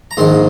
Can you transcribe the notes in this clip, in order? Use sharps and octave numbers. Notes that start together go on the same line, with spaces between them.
A#5
A#1 G#2 D#3 C6